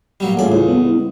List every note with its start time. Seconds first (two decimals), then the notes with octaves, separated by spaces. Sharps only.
0.20 A#2 F#3 G3
0.37 A1 F4 G#4 A4 C#5 D5
0.52 C#2 E4
0.68 G3 B3
0.97 C4